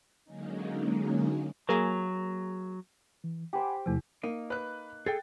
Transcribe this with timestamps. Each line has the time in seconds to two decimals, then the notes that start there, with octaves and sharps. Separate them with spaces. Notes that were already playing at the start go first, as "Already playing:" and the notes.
0.24 D3 F#3 G#3 A#3 C#4 D#4
1.69 F#3 A#3 G#4 A#4
3.24 E3
3.53 G4 C5 F#5 G#5 B5 D6
3.86 E2 C3 F3 A3
4.23 A#3 D#4
4.50 B4 F#6
5.06 G#4 A4 G5 A6